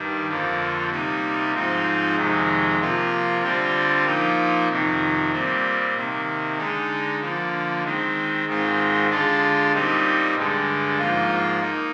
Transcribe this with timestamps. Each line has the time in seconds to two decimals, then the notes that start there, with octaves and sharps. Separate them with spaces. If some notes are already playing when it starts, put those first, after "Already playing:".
Already playing: G2 D#3 G3
0.28 F2 D3 F3 A#3
0.91 C3 G3 A#3 D#4
1.53 G#2 F3 C4 D#4
2.16 F2 C3 D#3 G#3
2.79 C3 F3 A#3 F4
3.42 D3 G3 C4 F4
4.05 A#2 F3 A#3 D#4
4.69 F2 C3 D#3
5.31 A#2 G3 C4
5.94 C3 D#3 A#3
6.57 D3 G#3 D#4
7.20 D3 F3 A#3
7.83 D#3 G#3 C4
8.46 G#2 D#3 G#3 C4 F4
9.09 D3 G#3 D4 F4
9.72 A#2 G3 C4 D#4
10.35 G2 D3 G#3
10.98 G#2 F3 A#3 F4
11.61 A#3 D#4